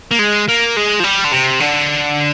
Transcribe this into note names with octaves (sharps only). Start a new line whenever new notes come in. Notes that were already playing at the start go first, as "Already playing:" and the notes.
A#3
G#3
A#3
G#3
F3
G3
D3
C3
D3